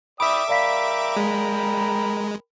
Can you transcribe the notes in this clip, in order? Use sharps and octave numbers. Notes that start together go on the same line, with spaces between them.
D5 E5 G5 B5 D6 D#6
A#4 D5 F5 G5 B5 B6
G#3